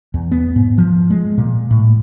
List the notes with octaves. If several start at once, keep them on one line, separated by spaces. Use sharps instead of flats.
E2
B3
G#2
F3
G#3
A#2
A2